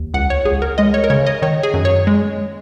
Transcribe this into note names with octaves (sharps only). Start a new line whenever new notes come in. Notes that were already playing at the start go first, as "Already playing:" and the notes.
Already playing: D#2
C#2 F#5
C#5
C#2 G#4
A#4
G#3 D#5
C#5
A#4
C#3 C#5
D#5
D#3 C#5
G#4
F#2
C#5
G#3